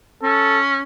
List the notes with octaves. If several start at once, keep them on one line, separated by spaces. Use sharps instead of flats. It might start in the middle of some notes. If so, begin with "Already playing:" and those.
C#4 A4